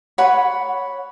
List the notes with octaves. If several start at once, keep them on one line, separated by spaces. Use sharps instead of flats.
C#5 F#5 B5